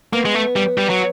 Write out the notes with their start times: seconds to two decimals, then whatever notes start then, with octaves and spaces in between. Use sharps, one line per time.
0.13 A#3 B3
0.26 G#3
0.35 A3
0.56 G3
0.78 G3
0.90 F#3